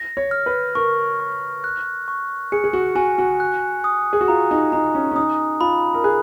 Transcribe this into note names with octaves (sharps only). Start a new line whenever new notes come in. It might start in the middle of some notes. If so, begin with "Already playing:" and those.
Already playing: A#6
C#5
F6
B4
A#4 C#6
C#6
F#6
C#6
G#4 C#7
G#4
F#4
F#4 G#5
F#4
F#6
D#6
G#4
F#4
F4 A#5
D#4
D#4 A#5
C#4
C#4
D#4 D#6
F4 B5
A#4
G#4 F#6